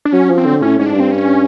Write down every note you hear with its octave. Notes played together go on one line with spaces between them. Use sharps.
D4
F#3 C#4
F3
C4
D3
A2 C#4
G#2 C#4
D4
G2
C4
C#4